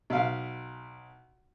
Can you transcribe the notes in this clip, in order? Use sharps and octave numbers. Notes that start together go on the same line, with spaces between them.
B1 E5 F5